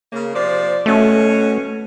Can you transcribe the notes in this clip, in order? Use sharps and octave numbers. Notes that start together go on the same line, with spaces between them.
C#3 A#3
C3 F3 D5
B2 A3 C#4